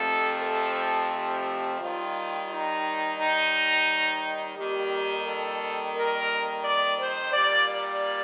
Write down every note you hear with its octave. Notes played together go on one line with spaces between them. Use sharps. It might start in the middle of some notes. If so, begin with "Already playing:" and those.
Already playing: F2 C3 F3 A3 C4 A4
A4
G4
D#2 D#3 G3 F4
D#4
D#4
F2 D#3 G3 A#3 G4
A4
A#4
D5
C5
A#2 G3 A#3 D5
D5